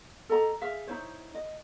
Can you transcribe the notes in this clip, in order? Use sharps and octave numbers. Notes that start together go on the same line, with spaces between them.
A4 D#5 A#5
G#4 E5 F5
D#4 E4 C5 C#5
D#5